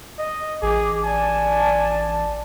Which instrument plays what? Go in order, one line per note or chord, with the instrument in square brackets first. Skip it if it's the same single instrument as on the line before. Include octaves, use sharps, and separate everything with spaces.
[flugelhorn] D#5
[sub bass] A1 [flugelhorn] G#4 [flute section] D6
[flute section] D5 A5 [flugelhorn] G#5